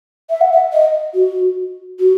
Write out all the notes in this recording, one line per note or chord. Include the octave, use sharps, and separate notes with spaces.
E5
F#5
E5
D#5
F#4
F#4